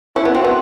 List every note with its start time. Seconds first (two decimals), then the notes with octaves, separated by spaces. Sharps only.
0.16 C#4 E4
0.25 B3
0.35 C4 F#4
0.44 B3